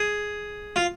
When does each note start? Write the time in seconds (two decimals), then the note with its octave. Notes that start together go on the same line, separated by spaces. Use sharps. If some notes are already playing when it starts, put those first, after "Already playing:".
Already playing: G#4
0.76 F4